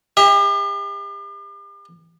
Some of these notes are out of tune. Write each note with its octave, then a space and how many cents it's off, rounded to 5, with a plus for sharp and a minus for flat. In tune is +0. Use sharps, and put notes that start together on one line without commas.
G4 +40 E5 -30